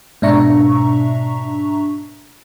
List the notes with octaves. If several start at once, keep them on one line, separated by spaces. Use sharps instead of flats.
G#2 B2 D4 E5 A#5 C#6